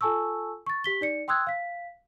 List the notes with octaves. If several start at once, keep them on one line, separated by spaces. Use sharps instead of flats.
F4 A4 G#5 A5 C#6 E6
C#6 A6
G4 B6 G7
D#4 D5 C#7
G5 C6 D#6 E6 F#6 G#6
F5 B6